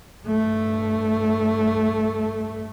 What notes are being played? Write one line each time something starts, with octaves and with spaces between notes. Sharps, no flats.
G2 A3